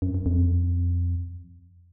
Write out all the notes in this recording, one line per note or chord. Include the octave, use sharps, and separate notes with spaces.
F#2
F#2
F2